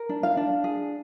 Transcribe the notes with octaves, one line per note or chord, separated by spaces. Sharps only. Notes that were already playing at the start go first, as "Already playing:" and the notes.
Already playing: A#4
D4
F5
D4
G#4